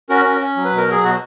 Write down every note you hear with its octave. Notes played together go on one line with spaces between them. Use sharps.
C#4 F#4 A#4
C#4
C#4
F#3
B4
B2
A#4
F#3 G#4
B2 F#4